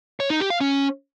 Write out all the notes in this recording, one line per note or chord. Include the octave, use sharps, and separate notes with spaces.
C#5
D#4
G4
F5
C#4